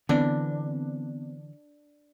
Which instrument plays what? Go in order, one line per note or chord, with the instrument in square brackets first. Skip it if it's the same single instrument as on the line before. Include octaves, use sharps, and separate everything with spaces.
[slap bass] D3 E3 [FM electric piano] B3 C4 [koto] D4